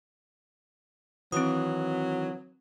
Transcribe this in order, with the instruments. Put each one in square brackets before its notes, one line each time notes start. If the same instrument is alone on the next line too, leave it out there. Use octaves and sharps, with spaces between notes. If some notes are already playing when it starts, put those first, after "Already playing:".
[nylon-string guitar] D#3 E3 [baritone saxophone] F#3 [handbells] C4 D#6